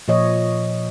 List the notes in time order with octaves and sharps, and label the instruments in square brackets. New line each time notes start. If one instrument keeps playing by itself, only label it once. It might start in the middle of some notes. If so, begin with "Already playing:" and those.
[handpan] A#2 F3 C#5 D#5